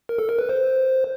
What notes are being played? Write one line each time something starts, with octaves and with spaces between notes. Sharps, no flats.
A#4
A4
A#4
B4
C5